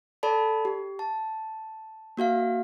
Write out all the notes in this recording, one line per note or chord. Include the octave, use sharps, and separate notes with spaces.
A4 D5 A5 B5
G4
A5
A#3 F#4 E5 F5